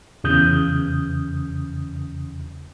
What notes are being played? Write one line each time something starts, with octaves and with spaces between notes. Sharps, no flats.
E2 C#3 D#6 G6